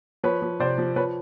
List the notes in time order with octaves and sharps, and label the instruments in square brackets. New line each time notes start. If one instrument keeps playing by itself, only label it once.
[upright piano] F3 B4 C#5
F3
C3 C5 D5
F3
F3 B4 C#5